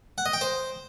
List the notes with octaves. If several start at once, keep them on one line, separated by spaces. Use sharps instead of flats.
F#5
D#5
G5
C5